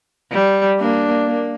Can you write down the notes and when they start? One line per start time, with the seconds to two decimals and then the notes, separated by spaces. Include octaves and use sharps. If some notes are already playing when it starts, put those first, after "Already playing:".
0.32 G3
0.80 A#3 D4
1.27 A#3